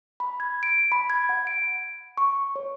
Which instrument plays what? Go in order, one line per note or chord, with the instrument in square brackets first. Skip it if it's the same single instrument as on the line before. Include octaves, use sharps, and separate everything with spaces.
[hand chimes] B5
G#6
D7
B5
G#6
F#5
D7
C#6
C#5